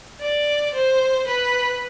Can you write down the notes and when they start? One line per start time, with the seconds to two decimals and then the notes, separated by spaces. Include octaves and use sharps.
0.20 D5
0.74 C5
1.27 B4